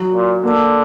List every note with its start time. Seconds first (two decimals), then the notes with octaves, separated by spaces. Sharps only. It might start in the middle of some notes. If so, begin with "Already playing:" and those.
Already playing: F#3
0.13 A#2
0.43 D3 A#3